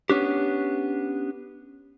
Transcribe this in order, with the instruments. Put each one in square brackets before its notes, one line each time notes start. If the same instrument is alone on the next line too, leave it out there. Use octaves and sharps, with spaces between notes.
[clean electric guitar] B3 C#4 D4 G4